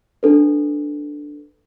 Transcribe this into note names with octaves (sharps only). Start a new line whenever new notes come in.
D4 A4 B4